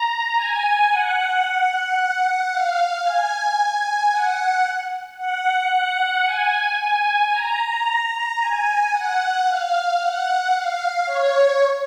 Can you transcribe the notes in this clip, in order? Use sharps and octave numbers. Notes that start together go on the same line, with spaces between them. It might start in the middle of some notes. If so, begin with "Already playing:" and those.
Already playing: A#5
G#5
F#5
F5
G#5
F#5
F#5
F#5
G#5
G#5
A#5
G#5
F#5
F5
F#5
F5
C#5